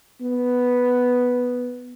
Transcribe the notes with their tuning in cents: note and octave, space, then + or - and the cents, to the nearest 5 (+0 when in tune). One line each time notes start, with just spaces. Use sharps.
B3 +0